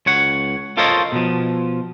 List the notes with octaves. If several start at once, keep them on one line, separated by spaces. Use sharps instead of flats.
C#2 C#5 F#5
F4 A4 A#4 C5 C#5 D#5
B2 F3